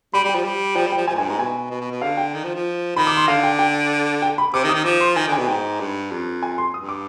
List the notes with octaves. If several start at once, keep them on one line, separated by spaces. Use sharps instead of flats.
G3 B5
G3
G5
F3
G3
F3 G5
G3
G5
F3
F3 G#5
G#2
G2 G#5
G#2
B2 G#5
B2
B2
B2
D3 F5
G5
D#3
F3
F3
D#3 B5
D6
C6
D3 F5
G5
G5
G5
B5
C3 D6
D#3
D#6
D#3
F3 D6
C6
D#3 G#5
D3
G#5
B2
G#2 G5
G2
F2
G#5
C6
G2 D#6
D6